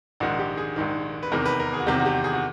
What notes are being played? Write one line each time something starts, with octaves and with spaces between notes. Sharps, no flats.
A#1 G#2 D#3 F#4
G4
G#4
A#1 G#2 D#3
B4
E2 C3 D#3 A#4
B4
A#4
G#4
F#4
E2 C3 D#3 G4
F#4
G4
G#4
F#4